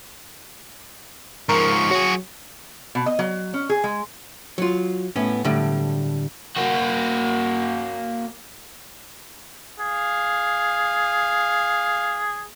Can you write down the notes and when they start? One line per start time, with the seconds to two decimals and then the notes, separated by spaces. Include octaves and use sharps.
1.49 G#2 F3 A#4 C#6
1.91 F#3 F#4 G#4
2.95 B2
3.06 D#5
3.19 F#3
3.54 C#4
3.69 G#4
3.84 G#3
4.58 F#3 F4
5.16 A2 B3 C#4
5.45 A2 D3 G3
6.56 A#3 F#4
9.79 G#4 F5